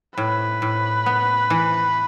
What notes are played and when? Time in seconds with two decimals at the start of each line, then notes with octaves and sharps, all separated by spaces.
0.18 A2 B4
0.62 A2
1.06 B3
1.50 E3